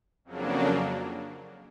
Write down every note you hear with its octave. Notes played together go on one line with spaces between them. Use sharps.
F2 C#3 F#3 A#3 D4